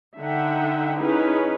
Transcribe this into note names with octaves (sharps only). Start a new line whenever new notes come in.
D3 D#4 E5 F#5 G5
C#4 D#4 E4 G#4 B4